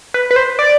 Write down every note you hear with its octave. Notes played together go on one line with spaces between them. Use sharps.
B4
B4
C5
D5